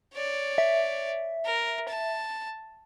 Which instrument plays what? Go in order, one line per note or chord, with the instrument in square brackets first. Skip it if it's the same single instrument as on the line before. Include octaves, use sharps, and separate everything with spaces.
[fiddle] C#5 D5
[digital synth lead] E5
[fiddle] A#4
A5